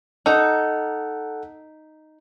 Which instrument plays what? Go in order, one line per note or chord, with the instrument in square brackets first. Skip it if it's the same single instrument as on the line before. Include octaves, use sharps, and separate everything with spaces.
[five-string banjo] D#4 [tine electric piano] A4 F#5